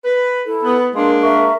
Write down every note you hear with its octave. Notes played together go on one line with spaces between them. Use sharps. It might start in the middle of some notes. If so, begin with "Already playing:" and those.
B4
E4 A4
B3
G#3 A#3 D4 A#4 C6
A#4 E5 C#6